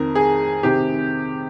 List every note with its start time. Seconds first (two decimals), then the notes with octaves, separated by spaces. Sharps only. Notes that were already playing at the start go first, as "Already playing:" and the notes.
Already playing: F2 D#3 A#4
0.15 G#4
0.63 C3 D#3 G4